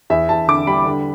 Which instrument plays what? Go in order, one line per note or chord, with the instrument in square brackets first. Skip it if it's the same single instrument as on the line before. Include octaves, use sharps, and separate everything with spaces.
[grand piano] E2 E5
E2 A5
D3 D6
G3 B5
D3